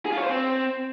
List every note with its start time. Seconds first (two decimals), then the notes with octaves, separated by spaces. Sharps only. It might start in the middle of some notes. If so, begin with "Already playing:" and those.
0.06 G#4
0.12 F4
0.18 C#5
0.24 C5
0.30 C4